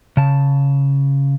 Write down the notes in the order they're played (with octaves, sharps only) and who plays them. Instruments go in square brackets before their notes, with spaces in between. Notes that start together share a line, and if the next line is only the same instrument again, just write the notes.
[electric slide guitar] C#3 A5